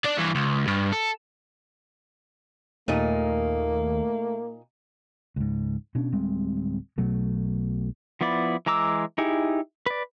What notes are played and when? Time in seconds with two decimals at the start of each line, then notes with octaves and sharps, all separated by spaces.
0.05 D4 D5
0.17 G2 E3
0.35 C#2
0.67 G2
0.93 A4
2.88 D#2 A#2 A3 A#3 D#4
5.36 C#2 G#2
5.95 B2 C#4 D4
6.12 D1 G3 G#3 C4
6.98 B1 B2 F#3 A3
8.21 F3 B3 E4 D5
8.66 E3 G#3 A#5 D6 E6
9.18 D#4 E4 G4 G#4
9.86 B4 D5